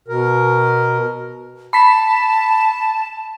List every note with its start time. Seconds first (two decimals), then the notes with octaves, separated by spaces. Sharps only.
0.08 B2 A#4
1.73 A5 B5 B6